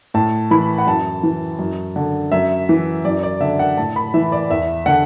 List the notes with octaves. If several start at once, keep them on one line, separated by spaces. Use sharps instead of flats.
A2 A5
E3 B5
F#5
F#2 A5
E3
F#2
D3
F#2 E5
E3
F#2 D5
D5
D3 E5
F#5
A2 A5
B5
E3 E5
D5
E2 E5
D3 F#5